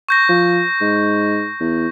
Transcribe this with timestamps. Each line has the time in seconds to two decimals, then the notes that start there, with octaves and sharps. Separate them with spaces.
0.09 C#6 G6 A#6
0.29 F3
0.81 G#2
1.60 E2